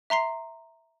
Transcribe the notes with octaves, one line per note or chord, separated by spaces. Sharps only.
E5 A#5 C6 C7